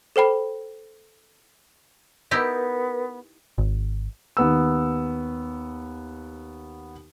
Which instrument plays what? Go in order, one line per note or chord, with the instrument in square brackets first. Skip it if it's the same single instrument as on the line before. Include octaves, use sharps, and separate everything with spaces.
[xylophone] A4 C5 G5 B5
[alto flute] B3 [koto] D#4 E4 G4 [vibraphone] A#4 B4
[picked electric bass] G#1
[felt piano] D#2 B3 E6